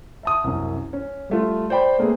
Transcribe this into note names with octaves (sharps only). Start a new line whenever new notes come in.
E5 A5 D#6
C2 F#2
C#4
G3 A3 F4
C5 D5 G5 B5
A3 A#3 C4 G#4 B4